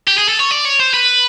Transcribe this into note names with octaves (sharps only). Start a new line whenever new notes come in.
G4
G#4
A4
C#5
D5
C#5
C5
B4